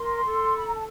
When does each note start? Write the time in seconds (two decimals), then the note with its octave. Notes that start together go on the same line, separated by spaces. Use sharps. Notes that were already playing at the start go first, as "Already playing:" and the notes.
Already playing: A#4 C6
0.25 A4
0.57 B5
0.66 A#5
0.74 A5